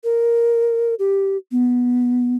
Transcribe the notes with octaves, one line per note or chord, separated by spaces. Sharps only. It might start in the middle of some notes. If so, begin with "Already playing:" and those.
A#4
G4
B3